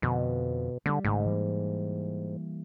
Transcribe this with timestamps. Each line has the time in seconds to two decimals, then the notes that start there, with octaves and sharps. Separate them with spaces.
0.02 F2 B2 D3 F3
0.86 D3 G3 A3
1.05 G#1 G#2 C#3 A3
1.26 E3 G3 A#3